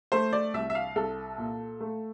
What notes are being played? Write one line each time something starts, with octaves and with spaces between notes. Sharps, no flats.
A3 C5
D5
C2 E5
E5
F5
C2 A4
A#2
A3